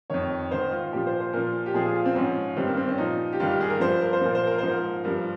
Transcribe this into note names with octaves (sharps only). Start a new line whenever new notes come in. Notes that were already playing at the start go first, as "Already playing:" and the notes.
F2 D#3 C#5
G#2 D#3 C5
F4
A#2 F3 G4
C5
C5
A#2 F3 A#4
G4
A#2 F3 G#4
G#4
F4
C4
G#2 F3 C#4
G2 D#3 C4
A#3
C4
C#4
A#2 F3 D#4
G4
G2 D#3 F4
G4
G#4
A#4
G2 F3 C5
A#4
C5
A#2 F3 A#4
C5
A#4
G#2 F3 C5
A#4
G2 F3 A#4